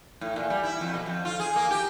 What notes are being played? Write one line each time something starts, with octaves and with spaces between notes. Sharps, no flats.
A2
A#2
G3
E4
F2
B2
F2
F4
G#4
A#3
G4